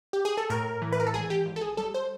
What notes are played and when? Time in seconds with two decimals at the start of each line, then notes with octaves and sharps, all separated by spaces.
0.13 G4
0.25 G#4
0.37 A4
0.50 A2 A#4
0.82 E3
0.92 B4
1.00 A#4
1.07 A4
1.14 G#1 G#4
1.30 G4
1.46 G#1
1.56 A4
1.61 G#4
1.77 G3 A4
1.94 C5